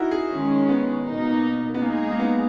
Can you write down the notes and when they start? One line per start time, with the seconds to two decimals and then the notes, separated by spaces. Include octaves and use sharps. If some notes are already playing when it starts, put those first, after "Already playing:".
Already playing: D#4 E4 F#4 A#4
0.11 G#4
0.31 D#3 G#3 C#4
0.69 B3
1.06 B2 A#3 D#4
1.74 B3
1.82 G#3 A#3 D#4 G#4
2.11 A#3
2.19 B3